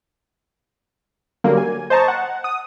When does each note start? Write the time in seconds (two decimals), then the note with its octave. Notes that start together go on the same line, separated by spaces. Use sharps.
1.44 D3 F#3 G3 A#3
1.57 G#5
1.90 C5 D#5 A5 A#5 C#6
2.08 F#5
2.44 D#6